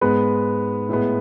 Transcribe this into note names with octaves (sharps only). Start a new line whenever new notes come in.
G#2 G#3 B3 B4
A2 G#3 B3